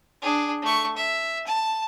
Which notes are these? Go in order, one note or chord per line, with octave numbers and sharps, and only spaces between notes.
D4 G#4
A3 C#6
E5
A5